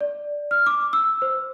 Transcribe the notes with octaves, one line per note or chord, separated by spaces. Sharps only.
D5
F6
D6
E6
C5